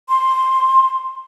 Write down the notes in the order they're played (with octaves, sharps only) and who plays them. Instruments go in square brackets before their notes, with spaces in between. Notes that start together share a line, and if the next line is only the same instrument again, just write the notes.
[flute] C6